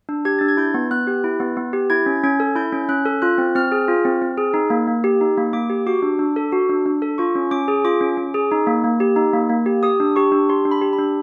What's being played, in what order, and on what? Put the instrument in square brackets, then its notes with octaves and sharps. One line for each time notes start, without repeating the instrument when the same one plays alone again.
[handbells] D4
G4 G#6
D4 A6
G#6
E4 G6
B3
B3 F#6
G4
E4
B3
B3
G4
E4 G#6
C#4
C#4 G#6
A4
E4 G6
C#4
C#4 F#6
A4
F4 F#6
C4
C4 F6
G#4
F4
C4
C4
G#4
D#4
A#3
A#3
G4
D#4
A#3
A#3 D6
G4
F#4 D6
D4
D4
A4
F#4
D4
D4
A4
F4 C#6
C#4
C#4 D6
G#4
F4 D6
C#4
C#4
G#4
D#4
A#3
A#3
G4
D#4
A#3
A#3
G4
G4 D#6
D4
G4 C#6
D4
G4 C6
D4
B5
G4
B5
D4